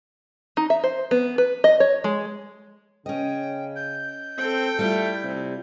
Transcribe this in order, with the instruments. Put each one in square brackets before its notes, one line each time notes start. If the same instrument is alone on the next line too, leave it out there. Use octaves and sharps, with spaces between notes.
[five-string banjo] D#4
E5
C5
B3
B4
D#5
C#5
G#3
[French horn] C#3 [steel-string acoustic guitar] C#4 D#5 [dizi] G5
[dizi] G6
[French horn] C4 [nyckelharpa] A4 G5
[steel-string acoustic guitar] G3 E4 F4 [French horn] A3
[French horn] C3